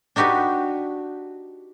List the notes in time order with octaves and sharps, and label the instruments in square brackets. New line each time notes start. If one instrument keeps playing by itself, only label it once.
[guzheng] D4 D#4 F#4 G4 B4